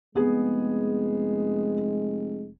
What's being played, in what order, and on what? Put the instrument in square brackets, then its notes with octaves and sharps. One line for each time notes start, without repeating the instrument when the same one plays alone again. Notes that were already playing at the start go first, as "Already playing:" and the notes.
[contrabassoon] F1 [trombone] G#3 [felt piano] B3 G#4